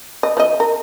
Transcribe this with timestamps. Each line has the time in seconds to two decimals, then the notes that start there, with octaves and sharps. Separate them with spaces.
0.23 D#5
0.37 F3 D#5
0.60 A#4